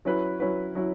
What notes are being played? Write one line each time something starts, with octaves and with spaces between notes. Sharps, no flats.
F#3 C#4 E4 B4
F#3 C#4 E4 B4
F#3 C#4 E4